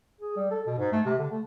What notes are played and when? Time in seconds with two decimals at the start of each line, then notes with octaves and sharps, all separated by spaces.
0.20 G#4
0.36 G3
0.51 A4
0.67 B2
0.78 G#2
0.92 A3
1.06 C3
1.18 D3
1.31 A3